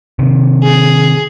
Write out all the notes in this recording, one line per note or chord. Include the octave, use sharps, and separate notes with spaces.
C3 D#3
G#4